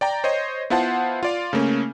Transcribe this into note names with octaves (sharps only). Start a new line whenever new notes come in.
D5 G5 A#5
C5 C#5 D#5
B3 E4 F4 C5 F#5 A5
F4 D5 F5
C#3 A3 A#3 C#4